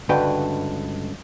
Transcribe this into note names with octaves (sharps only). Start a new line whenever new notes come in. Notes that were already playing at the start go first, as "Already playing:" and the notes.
C#2 G2 D3 F#4 B4 G5